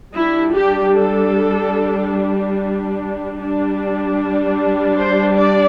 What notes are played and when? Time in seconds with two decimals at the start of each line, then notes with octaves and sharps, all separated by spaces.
0.15 G3 D4 E4
0.55 G4
0.96 A4
3.37 G3 D4
4.97 C5
5.37 D5